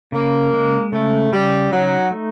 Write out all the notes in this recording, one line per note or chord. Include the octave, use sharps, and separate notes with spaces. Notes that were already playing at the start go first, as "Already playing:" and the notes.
C#3 A#3
G#3
C#3 A3
C#3 G3
F#3 D#4
A3